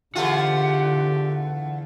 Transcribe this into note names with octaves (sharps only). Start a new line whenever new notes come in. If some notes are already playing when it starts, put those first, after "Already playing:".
E2 D3 A3 F4 G4 F#5